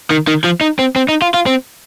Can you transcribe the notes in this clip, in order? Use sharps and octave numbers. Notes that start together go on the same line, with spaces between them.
D#3
D#3
F3
D#4
C4
C4
D#4
F4
F4
C4